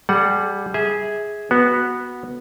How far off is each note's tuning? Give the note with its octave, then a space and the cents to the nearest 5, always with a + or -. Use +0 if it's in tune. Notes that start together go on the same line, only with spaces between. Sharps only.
G3 +0 G#4 +40 F#5 +0
G#4 +0 E5 -25
B3 -10 F#4 +0